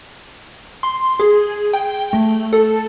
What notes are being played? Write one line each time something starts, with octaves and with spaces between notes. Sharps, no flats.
C6
G#4
G5
A3
A4